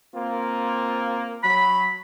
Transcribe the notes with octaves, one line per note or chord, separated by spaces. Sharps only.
A#3 C4 F4
F#3 B5